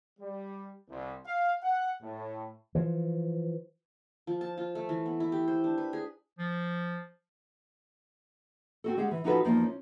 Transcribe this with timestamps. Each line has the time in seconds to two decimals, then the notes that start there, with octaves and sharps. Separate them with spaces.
0.20 G3
0.89 C2
1.26 F5
1.63 F#5
2.01 A2
2.75 E3 F3
4.27 F3
4.41 A5
4.58 F4
4.75 A3
4.89 E3
5.06 B3
5.20 E4
5.32 G4
5.48 C5
5.64 D4
5.78 B4
5.93 G#4
6.39 F3
8.84 C4 F#4 A4
8.97 G#3 G4 G#4 F5 F#5
9.11 E3
9.24 F3 D#4 F4 F#4 A4 B4
9.44 E2 F3 G3 A#3 D#4
9.63 C#4